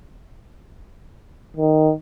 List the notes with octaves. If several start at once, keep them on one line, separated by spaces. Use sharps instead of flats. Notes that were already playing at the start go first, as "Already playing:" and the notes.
D#3